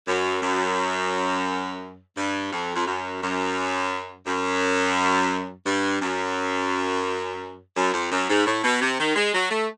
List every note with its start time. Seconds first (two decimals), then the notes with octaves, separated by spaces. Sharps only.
0.07 F#2
0.42 F#2
2.17 G2
2.52 F2
2.75 F2
2.87 F#2
3.22 F#2
4.26 F#2
5.66 G2
6.02 F#2
7.76 F#2
7.94 F2
8.12 F#2
8.29 G#2
8.46 A2
8.64 B2
8.81 C3
8.99 D#3
9.16 G#3
9.34 F#3
9.51 A3